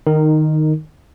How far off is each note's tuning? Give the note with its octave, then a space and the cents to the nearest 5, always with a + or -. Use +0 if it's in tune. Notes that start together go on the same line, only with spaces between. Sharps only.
D#3 -15 D#4 +0 A#4 -10